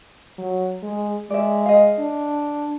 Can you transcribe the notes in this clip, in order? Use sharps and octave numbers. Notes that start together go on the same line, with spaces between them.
F#3
G#3
G#3 D5 E5
D#5 F5
D4